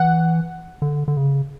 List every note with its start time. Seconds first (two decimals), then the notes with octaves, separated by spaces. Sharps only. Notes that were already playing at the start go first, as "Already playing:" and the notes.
Already playing: E3 F#5
0.82 D3
1.08 D3
1.17 C#3